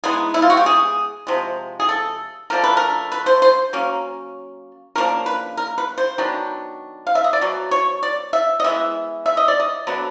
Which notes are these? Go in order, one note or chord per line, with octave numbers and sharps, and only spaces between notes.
E3 G#3 B3 D#4 G#4
E4
F4
F#4
G4
G#4
C3 F3 G#3
G#4
A4
D3 F3 A3 D4 A#4
B4
A#4
B4
C5
C5
F#3 A#3 C#4
C#3 F3 A#3 D4 A#4
B4
A#4
B4
C5
D#3 F#3 B3 D4
F5
E5
D#5
D5
B2 F#3
C#5
D5
E5
D#5
E3 G#3 B3 E5
E5
D#5
D5
D#5
D3 F#3 B3 D4